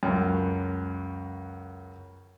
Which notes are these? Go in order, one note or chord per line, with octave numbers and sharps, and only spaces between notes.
C#2 F#2